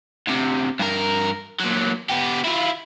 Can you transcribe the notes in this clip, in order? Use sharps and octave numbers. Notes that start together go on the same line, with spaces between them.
D2 C3
G2 A#4
A#2 F#3
B3 G4
E4 F4